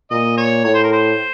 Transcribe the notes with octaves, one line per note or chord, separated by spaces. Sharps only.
A#2 D#5
C#5
A2 C#5
C5
A#4
C5